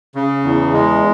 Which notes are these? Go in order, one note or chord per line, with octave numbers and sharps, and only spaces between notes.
C#3
E2
G#3